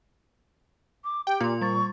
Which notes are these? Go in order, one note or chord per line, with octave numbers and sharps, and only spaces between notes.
D6
G4 G5
A#2 F4 C6
G3 C#6 A6